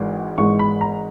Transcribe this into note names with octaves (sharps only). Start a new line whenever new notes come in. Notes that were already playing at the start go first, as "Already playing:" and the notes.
Already playing: G#1 G#2 E3 G#3
G#1 G#2 E3 G#3 C#6
B5
A#5